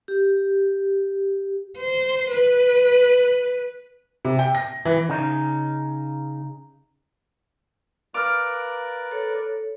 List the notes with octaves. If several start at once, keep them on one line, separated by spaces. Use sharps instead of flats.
G4
C5
B4
C3
G5
A#6
E3
C#3 D#4
A#4 B4 D5 F5 D6 F6
A4 C#5